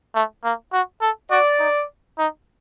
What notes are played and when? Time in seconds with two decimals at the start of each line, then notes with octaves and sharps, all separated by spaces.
0.15 A3
0.44 A#3
0.73 F#4
1.02 A4
1.31 F#4 D5
1.59 D#4
2.18 D#4